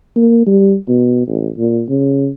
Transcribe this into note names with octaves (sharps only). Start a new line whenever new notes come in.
A#3
G3
B2
A1
A#2
C#3